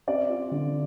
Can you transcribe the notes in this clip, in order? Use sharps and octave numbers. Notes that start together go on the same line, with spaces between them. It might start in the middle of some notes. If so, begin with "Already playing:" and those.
C4 D5
F4
D3